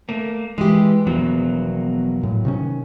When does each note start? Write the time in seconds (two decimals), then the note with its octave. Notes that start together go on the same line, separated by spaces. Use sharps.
0.09 A3 A#3
0.58 E3 G#3 G4
1.07 E1 E2 F3 F#3 A#3 B3
2.23 A2
2.45 C3 D#3 C#4